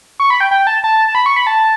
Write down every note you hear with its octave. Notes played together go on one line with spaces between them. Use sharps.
C#6
B5
G5
G5
A5
A5
A5
B5
C#6
B5
A5